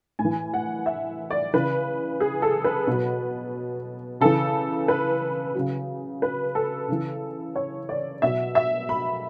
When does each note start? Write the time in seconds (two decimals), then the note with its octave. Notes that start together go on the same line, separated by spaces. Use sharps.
0.19 A2 G#5
0.25 E3
0.54 F#5
0.86 E5
1.31 D5
1.53 C#3 E3 B4
2.20 G#4
2.42 A4
2.64 B4
2.87 B2 F#3
4.21 C#3 E3 A4
4.88 B4
5.55 C#3 F#3
6.22 B4
6.55 A4
6.89 C#3 E3
7.56 C#5
7.89 D5
8.22 B2 F#3 E5
8.55 E5
8.89 B5